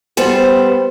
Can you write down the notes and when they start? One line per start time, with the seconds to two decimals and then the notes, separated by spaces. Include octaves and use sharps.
0.17 G3 B3 C5